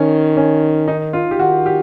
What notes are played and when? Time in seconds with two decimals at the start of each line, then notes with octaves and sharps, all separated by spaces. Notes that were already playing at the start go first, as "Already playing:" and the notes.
Already playing: D#3 C#4
0.37 C#4
0.88 D#4
1.13 F4
1.31 G4
1.39 D#3 F#4
1.66 G4